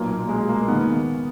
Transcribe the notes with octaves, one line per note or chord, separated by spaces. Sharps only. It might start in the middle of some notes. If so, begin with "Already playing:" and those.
Already playing: B1 A#2 A#3
G#3
A#3
D#2 D#3 B3